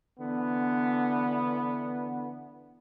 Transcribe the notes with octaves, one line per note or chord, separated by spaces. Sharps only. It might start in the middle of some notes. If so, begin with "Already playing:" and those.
D3 E3 B3